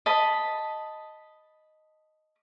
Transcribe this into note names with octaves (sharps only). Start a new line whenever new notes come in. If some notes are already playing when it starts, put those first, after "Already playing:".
D#5 A5 B5